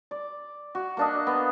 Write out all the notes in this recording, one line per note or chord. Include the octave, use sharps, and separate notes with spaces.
D5
F#4
A#3 D4 D#5
B3